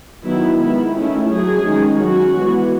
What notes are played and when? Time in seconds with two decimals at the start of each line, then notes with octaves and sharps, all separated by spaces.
0.24 D#3 F#3 B3 E4
0.59 D#3 G#3 B3 E4
0.94 D#3 A3 C#4 E4
1.29 F#3 A3 C#4 G#4
1.65 D#3 G#3 C#4
2.00 F#3 C#4 F#4
2.35 E3 G#3 B3